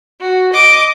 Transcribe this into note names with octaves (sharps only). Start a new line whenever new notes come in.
F#4
D#5 D6